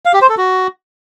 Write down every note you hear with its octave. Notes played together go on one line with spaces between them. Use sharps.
F5
G4
C5
A4
F#4